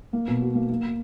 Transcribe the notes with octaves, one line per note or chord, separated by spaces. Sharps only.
A#3
B2
F#4
A#3
A#3